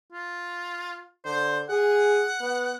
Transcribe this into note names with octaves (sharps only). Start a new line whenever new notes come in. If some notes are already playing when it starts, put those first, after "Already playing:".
F4
D3 C5
G#4 F#5
B3